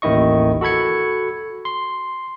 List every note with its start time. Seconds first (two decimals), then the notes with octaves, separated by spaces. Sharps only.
0.02 A1 D#2 D#3 E4 D#5 C#6
0.61 F#4 A4 B5 G#6 C#7
1.65 C6